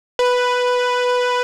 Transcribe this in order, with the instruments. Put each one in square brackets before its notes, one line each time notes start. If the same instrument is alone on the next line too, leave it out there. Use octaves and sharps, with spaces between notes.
[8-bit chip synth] B4